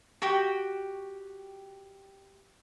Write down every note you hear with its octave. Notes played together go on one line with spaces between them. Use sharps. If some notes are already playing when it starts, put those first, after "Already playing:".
F#4 G4 G5